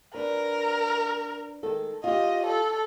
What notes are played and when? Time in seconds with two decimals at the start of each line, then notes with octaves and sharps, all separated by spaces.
0.14 D4 A#4 B4
1.63 D#3 G#3 A4
2.04 F4 G4 D#5
2.46 A4